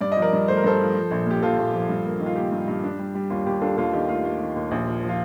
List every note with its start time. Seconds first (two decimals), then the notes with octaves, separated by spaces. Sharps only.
0.01 G2 D5
0.12 D#5
0.17 F3
0.22 A#4 D5
0.33 G2
0.48 A3 C5
0.57 A#4
0.64 G2 A4 C5
0.80 F3
0.95 F3
1.11 A#1
1.26 A#2 G4
1.42 F3 F4 A4
1.58 A#1
1.73 F3
1.89 G2
2.06 A#3
2.20 D#3
2.26 F4
2.36 A#3 G4
2.52 G2
2.68 G2
2.83 D4
2.99 G3
3.15 G3
3.30 D#2 F4
3.46 D#2 G4
3.61 D4 F4 A4
3.77 D#2 F4 A4
3.93 D#3 G4
4.09 A3 F4
4.24 A3 F4
4.41 D#3
4.56 D#2
4.71 A#1
4.87 F3
5.03 F3
5.09 F4